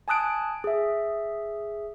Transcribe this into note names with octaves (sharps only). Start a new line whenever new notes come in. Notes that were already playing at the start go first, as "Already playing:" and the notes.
G#5 A5 D#6 F#6 D7
G#4 E5